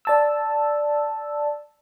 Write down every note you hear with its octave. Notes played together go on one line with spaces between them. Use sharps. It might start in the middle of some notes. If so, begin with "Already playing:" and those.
D5 A5 E6